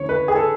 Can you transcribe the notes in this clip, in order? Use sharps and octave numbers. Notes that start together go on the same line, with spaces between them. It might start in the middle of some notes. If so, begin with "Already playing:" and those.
Already playing: D2 C#3 E3 C#5
B4
G#4
A4